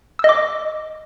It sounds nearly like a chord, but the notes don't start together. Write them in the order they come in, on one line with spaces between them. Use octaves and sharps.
E6 D#5 D6